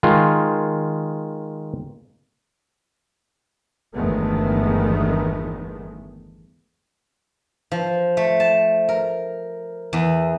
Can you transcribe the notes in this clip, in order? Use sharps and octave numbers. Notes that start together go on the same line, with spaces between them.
D#3 G#3 F4
G1 E2 D#3 G#3 A3 B3
F3
A3
A5
A#4
E2